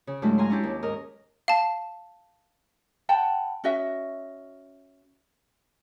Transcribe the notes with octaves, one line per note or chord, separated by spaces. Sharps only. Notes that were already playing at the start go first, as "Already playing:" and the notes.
C#3
G2 F#3 G#3 A3 E4
F5 G#5 A#5 C6
C#4 D4 E4 G4
D#2
G#2 A#4 D#5
F5 A5
F#5 G5 A5 B5
C#4 F#4 D#5 E5